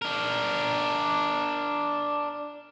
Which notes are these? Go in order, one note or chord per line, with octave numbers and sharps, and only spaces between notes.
D4 A#4